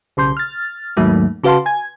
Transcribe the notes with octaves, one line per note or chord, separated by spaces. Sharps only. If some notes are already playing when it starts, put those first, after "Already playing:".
B1 C#3 C6 G6
F6 A6
D#2 G#2 D#3 F#3 A3 A#3
C#3 F#4 B4 F5 A5 C6
G#5 G#6